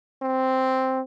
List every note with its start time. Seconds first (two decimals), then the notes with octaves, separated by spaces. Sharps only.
0.22 C4